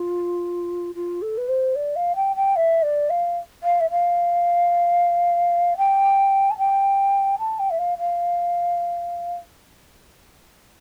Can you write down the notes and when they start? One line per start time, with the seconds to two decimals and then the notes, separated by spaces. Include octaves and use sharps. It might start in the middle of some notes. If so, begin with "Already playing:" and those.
Already playing: F4
0.95 F4
1.22 A4
1.37 B4
1.48 C5
1.75 D5
1.96 F5
2.15 G5
2.36 G5
2.56 E5
2.82 D5
3.10 F5
3.63 F5
3.80 E5
3.90 F5
5.77 G5
6.50 A5
6.58 G5
7.38 A5
7.59 G5
7.70 E5
7.79 F5
7.98 F5